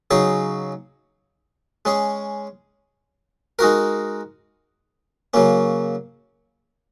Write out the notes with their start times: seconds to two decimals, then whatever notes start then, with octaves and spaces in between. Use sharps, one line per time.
0.11 C#3 F#3 D#4 G#4 C#5
1.85 G#3 C#4 G#4
3.59 G#3 D#4 F#4 A#4
5.34 C#3 F#3 A#3 C#4